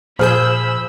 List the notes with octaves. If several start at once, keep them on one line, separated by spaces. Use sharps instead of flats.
A#2 F3 G#4 C5 B5 E6 F6 G6